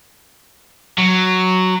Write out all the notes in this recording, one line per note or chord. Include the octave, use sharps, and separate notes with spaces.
F#3